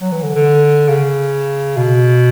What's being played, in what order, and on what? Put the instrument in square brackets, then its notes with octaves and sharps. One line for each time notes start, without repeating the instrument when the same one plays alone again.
[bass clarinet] F#3
E3
D3
D3
C#3
B2